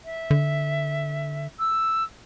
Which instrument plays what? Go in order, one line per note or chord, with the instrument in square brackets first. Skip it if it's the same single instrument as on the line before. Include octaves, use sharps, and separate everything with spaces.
[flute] E5
[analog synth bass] D3
[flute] E6